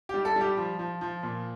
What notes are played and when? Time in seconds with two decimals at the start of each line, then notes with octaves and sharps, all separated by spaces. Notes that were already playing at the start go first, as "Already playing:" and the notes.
0.09 G3 G4
0.25 A4
0.36 G3 G4
0.57 F3
0.79 F3
1.01 F3
1.23 A#2